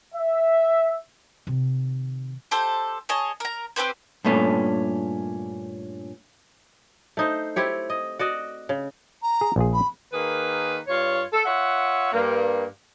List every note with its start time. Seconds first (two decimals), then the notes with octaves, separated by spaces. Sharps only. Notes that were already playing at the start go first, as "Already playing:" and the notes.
0.14 E5
1.47 C3 D#3
2.51 G4 A4 C5
3.09 G#4 C#5 D#5 A5
3.40 A#4 A#5
3.76 C4 G4 B4 C5
4.24 G2 A#2 A3 C#4
7.17 A3 D#4 C5
7.56 C4 E4 G4 C#5
7.90 D#5
8.19 F#4 D5 D#5
8.69 C#3
9.22 A#5
9.41 G#4
9.56 A#1 F4 G#4
9.74 B5
10.13 D#3 A#3 G#4 B4
10.87 G2 F4 C#5
11.33 A4
11.46 F4 C#5 E5 F#5
12.13 G2 A#3